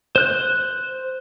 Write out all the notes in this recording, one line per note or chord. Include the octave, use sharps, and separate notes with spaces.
C5 F#6 G6